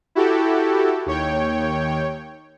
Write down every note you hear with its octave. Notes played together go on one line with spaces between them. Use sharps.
E4 F#4 G4 A4
D#2 C#5 G5